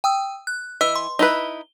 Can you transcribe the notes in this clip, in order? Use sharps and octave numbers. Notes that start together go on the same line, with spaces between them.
G5 D#6 E6
F#6
E3 D#5 E6
C6
D#4 E4 B4 G7